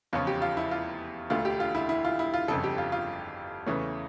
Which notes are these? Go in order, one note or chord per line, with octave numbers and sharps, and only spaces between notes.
F1 E2 C#3 F3 C#4 F4
G4
F4
E4
F4
E1 D2 D3 A3 F4
G4
F4
E4
E4
F4
E4
F4
G1 F2 C#3 A4
G4
F4
F4
E2 C#3 E3 A3 C#4